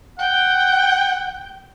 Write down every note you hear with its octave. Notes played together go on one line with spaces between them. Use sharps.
F#5 G5